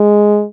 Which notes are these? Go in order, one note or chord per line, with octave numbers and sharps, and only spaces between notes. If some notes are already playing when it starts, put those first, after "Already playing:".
Already playing: G#3